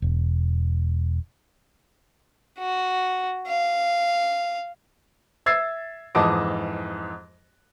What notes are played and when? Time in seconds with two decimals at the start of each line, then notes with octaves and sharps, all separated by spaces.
0.02 E1
2.58 F#4
3.47 F5
5.46 E5 E6 G#6 A6 C7
6.15 F2 G#2 E3 D#5 A5 D6